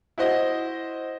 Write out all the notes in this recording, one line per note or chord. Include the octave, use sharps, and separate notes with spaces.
E4 F#4 C5 D#5